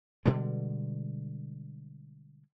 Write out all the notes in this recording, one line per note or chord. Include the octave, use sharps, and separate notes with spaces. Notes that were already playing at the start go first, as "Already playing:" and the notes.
B2 D3 G3 G#3